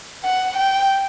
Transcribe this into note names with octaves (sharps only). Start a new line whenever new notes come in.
F#5
G5